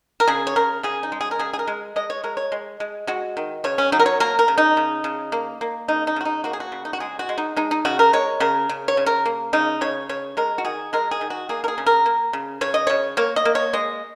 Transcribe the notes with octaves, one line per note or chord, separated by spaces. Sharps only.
A#4
C#3 G#4
C#5
C#3 A#4
C#3 G#4
D#4
G#3
G#4
A#4
C#3 G#4
G#4
A#4
G#3
G#3 D#5
C#5
G#3 A#4
C#5
G#3
G#3
G#3 F#4
D#3
C#3 C#5
C#4
F#3 D#4
A#4
C#5
A#3 A#4
A#4
C#3
D#4
C#3
C#3
A#3
A#3
C#3 D#4
D#4
C#3 F#4
D#4
A#3 F#4
G#4
F#4
C#3
D#4
F#4
G#3 G#4
F#4
G#3
D#4
G#3 D#4
D#4
C#3 F#4
A#4
G#3 C#5
C#3 A#4
C#3
C#5
C#3
A#4
A#3
C#3 D#4
C#3 C#5
C#3 C#5
G#3 A#4
F#4
D#3 G#4
G#3 A#4
G#4
D#3
F#4
A#3 G#4
A#4
G#4
C#3
A#4
A#3
C#3
C#3 C#5
D#5
C#3 C#5
A#3 C#5
D#5
A#3
C#5
G#3 D#5